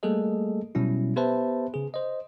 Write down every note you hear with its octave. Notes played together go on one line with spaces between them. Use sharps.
G3 A3 A#3 G#4 A4 D#5
B2 F#3 G3 C#4 E4
B3 G4 B4 C5 E5 A5
C#3 G#4
C5 D#5